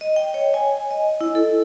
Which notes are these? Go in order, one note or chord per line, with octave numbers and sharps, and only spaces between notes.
D#5
G5
C#5
G#5
D#5
E4
A4